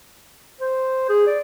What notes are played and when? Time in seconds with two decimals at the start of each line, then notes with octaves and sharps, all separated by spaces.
0.61 C5
1.09 G#4
1.27 D5